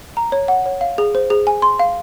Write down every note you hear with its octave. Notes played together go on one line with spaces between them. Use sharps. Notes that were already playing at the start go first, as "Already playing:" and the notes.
A#5
C#5
F#5
C#5
F5
G#4
C5
G#4
G#5
C6
F5